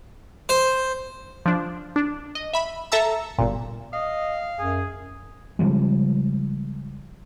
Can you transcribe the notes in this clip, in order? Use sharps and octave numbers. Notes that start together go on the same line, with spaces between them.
C5
F3 D4
D4
D#5
E5 B5
A4 E5 A5 A#5 E6
G1 A#2
D#5 F5
F#2 G#4
C#3 F3 G3 G#3